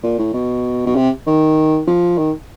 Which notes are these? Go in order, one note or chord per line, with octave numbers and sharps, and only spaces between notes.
A#2
A2
B2
B2
C3
D#3
F3
D#3